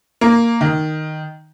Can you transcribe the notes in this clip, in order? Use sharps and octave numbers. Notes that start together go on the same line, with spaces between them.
A#3
D#3